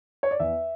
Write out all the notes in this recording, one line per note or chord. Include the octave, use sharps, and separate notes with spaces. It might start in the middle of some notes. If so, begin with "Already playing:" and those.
C#5
D5
E2 E5